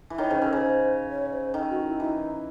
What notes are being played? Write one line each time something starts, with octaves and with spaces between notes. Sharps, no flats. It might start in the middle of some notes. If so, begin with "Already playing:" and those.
E3
D#3 C#5
C#3 C5
C#3 A4
C#3 C5 C#5
C#5
C5
D#3 A4
F#4
E4
E3 D#4 E4